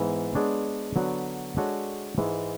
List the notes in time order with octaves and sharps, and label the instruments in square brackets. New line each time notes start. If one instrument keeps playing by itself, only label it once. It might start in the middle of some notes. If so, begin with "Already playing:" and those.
Already playing: [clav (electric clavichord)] G#2 E3 B3
G#3 B3 D4 G#4 C#5
D3 F#3 B3 F#4
G#3 D4 F#4 A4 C#5
G#2 E3 G#3